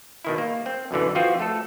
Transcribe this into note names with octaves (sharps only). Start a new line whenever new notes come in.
B2 D#3 E4
A#3
C4
F#2 B2 D3 E3
E3 F3 C4 F4 F#4
A3 A4